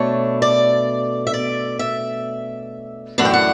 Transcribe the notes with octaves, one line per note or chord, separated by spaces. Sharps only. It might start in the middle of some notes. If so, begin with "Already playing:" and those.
Already playing: B2 A3 D4 C#5
D5
E5
D5
E5
F#2 E3 A3 D4 F#5
G5
F#5